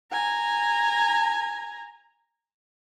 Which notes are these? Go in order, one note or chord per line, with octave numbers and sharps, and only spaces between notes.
G#5 A#5